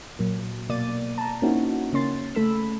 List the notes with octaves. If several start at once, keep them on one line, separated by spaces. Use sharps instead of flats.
A#2 F#3 A#3
B2 A#3 D5 A6 D#7
A5 A#5
A#3 C4 C#4 D#4 E4 F#4
C#3 A#3 C#4 C6 A6
C#3 A3 A4 B5 E6